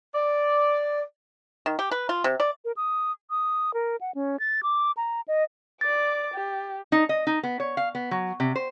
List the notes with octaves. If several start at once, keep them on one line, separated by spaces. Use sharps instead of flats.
D5
D#3
G4
B4
F4
C3
D5
A#4
D#6
D#6
A#4
F#5
C#4
A6
D6
A#5
D#5
D5 D6 A6
G4
D#4
D#5
D#4
B3
C#5
F5
B3
F#3
C3
C5